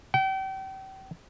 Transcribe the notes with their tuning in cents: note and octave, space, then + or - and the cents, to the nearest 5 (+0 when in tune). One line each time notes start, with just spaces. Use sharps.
G5 -35